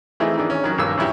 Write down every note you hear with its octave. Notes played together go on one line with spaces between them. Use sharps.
E3 A3 C4 D#4 E4 G#4
D#3 E3 D4
C#4
D#3 F#3
A#1 G2 D#3 A#3 E6
A#1 F#2 E4 G4